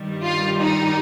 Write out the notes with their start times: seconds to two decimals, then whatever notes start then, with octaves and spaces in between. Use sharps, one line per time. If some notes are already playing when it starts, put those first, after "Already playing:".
Already playing: G2 D#3 G3
0.24 F4
0.60 D#4